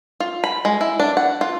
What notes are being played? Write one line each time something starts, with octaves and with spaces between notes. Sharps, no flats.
F4
B5
G#3
E4
D4
F#5
F4